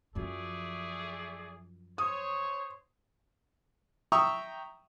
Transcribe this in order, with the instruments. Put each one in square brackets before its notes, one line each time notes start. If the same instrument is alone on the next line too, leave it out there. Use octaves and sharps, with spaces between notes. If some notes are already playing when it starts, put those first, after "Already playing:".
[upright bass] F#2 F3 [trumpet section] A3 G#4 D5
[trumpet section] C5 C#5 [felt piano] D#6
[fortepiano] E5 G5 A#5 C#6 D#6 E6